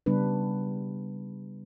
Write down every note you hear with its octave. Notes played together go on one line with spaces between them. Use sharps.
C#3 G3 B3 D4 B4